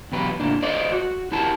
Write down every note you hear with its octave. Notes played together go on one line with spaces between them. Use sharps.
E2 B2 F#3 G4 B4
A2 C#3 A#3 D4
A4 C5 D5 D#5
F#4
E4 G4 A#4 A5